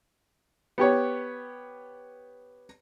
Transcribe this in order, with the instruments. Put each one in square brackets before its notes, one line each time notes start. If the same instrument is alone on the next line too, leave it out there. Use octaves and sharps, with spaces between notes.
[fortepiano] B3 G4 C#5